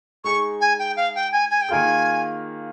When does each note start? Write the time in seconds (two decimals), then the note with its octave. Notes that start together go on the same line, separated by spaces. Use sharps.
0.24 G#3 D#4 G#4 C#6
0.61 G#5
0.79 G5
0.97 F5
1.15 G5
1.32 G#5
1.51 G#5
1.62 G5
1.69 D#3 A#3 F4 G#4 G#5